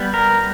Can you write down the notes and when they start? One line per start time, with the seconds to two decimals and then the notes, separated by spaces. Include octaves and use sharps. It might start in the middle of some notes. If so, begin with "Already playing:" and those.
Already playing: G3 B3
0.14 A#4